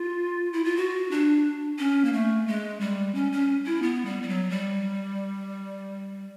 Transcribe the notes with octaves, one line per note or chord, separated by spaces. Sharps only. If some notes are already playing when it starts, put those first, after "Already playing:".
Already playing: F4
E4
F4
F#4
D4
C#4
A#3
A3
G#3
G3
C#4
C#4
E4
B3
G3
G3
F#3
G3